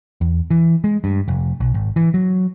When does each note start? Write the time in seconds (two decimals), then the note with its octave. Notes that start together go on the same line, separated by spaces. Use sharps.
0.21 E2
0.51 E3
0.84 G#3
1.04 G2
1.28 F1
1.60 B1
1.74 G#1
1.96 E3
2.14 F#3